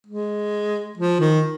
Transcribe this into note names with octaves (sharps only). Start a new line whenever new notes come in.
G#3
F3
D#3